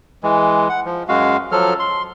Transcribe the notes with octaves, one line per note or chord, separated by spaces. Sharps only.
E3 G#3
F#5
F3
F#2 G#3 F#4 F5
F3 F#3 A4 F6
C6